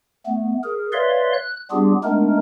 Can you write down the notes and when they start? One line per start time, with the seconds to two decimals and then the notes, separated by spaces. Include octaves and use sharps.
0.26 A3 B3
0.64 G#4 A#4
0.93 B4 C#5 D5 E5 F5 C6
1.34 F#6
1.71 G3 B3 D4 F4 G4 G#4
2.04 G#3 A3 B3 D4 D#4 A#4